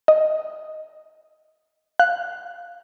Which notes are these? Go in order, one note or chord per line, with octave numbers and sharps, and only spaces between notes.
D#5
F5 F#6